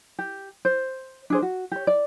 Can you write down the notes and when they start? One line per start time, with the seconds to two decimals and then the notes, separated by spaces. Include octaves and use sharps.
0.19 G4
0.65 C5
1.30 D4 G#4 C5
1.42 F#4
1.72 G4 C#5
1.87 D5